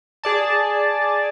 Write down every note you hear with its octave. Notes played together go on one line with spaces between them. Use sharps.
G#4 D5 A5